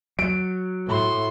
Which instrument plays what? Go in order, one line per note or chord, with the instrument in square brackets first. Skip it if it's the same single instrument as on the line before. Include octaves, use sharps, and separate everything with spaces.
[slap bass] F#3 [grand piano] D7
[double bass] A2 [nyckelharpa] F#4 C6